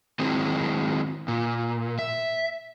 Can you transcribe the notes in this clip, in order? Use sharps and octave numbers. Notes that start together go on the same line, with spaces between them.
D#3 F#3 G#3 C4 E4
A#2
E5